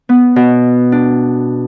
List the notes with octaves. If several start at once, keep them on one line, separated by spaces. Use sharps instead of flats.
B3
B2
D4